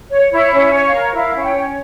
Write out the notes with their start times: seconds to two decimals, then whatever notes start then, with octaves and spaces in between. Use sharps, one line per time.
0.11 C#5
0.32 E4 C#5
0.53 C#4
0.59 E5
0.73 C#5
0.86 F5
0.94 A#4
1.14 E4 F5
1.35 C#4 F5
1.42 G5
1.55 C#5